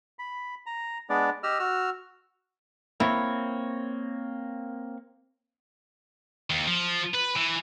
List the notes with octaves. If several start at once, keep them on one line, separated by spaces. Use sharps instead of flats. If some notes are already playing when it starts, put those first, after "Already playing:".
B5
A#5
G#3 B3 D4 D5
G4 D#5 E6 F6
F#4 E6 F6
A#3 C4 E4 C#5
D#2
F3
B4
E3